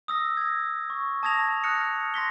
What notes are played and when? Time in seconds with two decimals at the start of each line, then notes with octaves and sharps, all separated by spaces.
0.08 D#6 E6 A#6
0.37 G#6 A#6
0.90 C#6
1.23 A5 D#6 G#6 A#6 F7
1.64 D#6 F6 F#6 A#6 C#7
2.14 C6 A#6 B6 G7